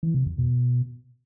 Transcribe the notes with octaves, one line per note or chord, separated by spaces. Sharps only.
E3
C3
F2
B2